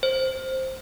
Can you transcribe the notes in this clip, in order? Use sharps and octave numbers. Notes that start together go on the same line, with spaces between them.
C5